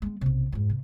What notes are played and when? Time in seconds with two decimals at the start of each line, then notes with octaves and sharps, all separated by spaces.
0.02 G#3 B3
0.21 B1 C3
0.52 F2 G#2
0.70 C3